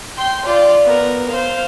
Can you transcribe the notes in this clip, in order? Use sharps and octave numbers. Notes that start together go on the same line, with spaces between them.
G5 C6
F4 D5
B3 A#4
C5 F5